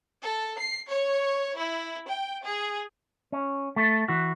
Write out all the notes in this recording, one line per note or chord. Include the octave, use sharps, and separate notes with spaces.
A4
C7
C#5
E4
G5
G#4
C#4
A3 A4
E3 F#4